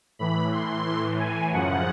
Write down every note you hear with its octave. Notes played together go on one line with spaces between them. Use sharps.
A2 E3 B5
C6
A2 E3
G#5
F#2 C#3 F3 F#5